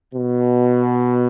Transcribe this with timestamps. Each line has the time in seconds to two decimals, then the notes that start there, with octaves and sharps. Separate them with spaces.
0.13 B2